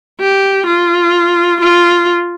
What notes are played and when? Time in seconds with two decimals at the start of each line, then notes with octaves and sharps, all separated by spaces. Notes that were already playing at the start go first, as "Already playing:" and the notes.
0.20 G4
0.66 F4
1.60 F4